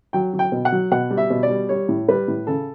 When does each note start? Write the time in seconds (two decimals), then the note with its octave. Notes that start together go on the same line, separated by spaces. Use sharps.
0.13 F#3 G5
0.33 F#3
0.39 G5
0.52 B2
0.65 F#5
0.72 F#3
0.92 B2 F#5
1.10 G3
1.17 E5
1.30 B2
1.43 D5
1.50 G3
1.69 G3 C#5
1.89 A2
2.08 G3 B4
2.28 A2
2.47 C#3 A4